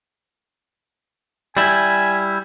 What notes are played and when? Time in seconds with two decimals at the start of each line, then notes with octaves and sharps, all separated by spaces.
1.57 G3 E4 G#5